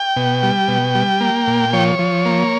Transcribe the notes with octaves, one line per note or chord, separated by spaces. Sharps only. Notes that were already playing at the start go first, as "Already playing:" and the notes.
Already playing: G5
B2
G3
B2
G3
A#3
A#2
F3 C#5
F3
A#3